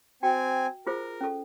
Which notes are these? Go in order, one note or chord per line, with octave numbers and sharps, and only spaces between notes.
C4 F#4 G5 G#5
F4 G#4 A#4 C5
C#4 A4